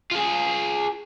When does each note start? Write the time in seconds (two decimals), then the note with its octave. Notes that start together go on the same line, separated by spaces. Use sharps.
0.12 F4 G#4